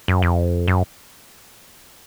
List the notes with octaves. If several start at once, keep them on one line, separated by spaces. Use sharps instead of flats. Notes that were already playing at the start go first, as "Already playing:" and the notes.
F#2
F2
F#2